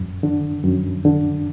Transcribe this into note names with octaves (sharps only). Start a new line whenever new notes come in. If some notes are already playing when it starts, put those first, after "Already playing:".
Already playing: F#2
D3
F#2
D3